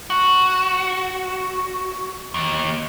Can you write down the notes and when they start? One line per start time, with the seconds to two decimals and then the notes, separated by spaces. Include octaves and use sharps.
0.10 F#4
2.34 D#2